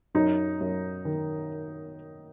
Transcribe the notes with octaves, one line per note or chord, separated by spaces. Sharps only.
F#2 D#4
F#2
D#3